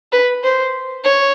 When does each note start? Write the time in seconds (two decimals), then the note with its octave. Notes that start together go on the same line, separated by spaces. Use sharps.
0.12 B4
0.43 C5
1.04 C#5